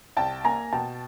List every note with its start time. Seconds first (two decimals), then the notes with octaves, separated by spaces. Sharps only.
0.17 C2 G5 A5
0.45 A#3 G#5 A#5
0.73 B2 G5 A5